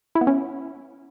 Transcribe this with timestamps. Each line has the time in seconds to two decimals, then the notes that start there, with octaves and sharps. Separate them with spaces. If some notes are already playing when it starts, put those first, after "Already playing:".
0.15 E4
0.21 B3
0.27 C#4